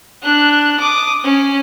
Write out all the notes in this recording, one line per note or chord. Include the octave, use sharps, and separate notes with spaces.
D4 F#6
D6 D#6
C#4